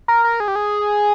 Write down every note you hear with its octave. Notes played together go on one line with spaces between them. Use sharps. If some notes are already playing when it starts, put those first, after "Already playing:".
A#4
A#4
G#4
G4
G#4